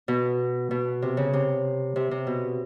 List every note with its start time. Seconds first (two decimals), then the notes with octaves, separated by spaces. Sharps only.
0.08 B2
0.71 B2
1.02 C3
1.17 C#3
1.33 C3
1.96 C3
2.11 C3
2.27 B2